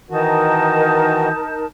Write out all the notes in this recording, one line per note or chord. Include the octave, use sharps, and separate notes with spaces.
D#3 E3 D#4 F#4 A#4 A5